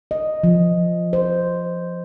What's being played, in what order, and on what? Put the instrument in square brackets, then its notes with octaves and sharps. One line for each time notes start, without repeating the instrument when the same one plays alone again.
[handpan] D#5
F3
C5